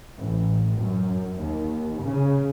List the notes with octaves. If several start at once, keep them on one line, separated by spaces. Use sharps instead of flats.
A1
F#2
D#2
C#3